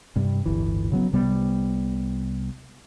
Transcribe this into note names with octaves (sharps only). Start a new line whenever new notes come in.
G2 C3
D1 G1 E3
C#3 F#3 B3
C2 C3 G3 B3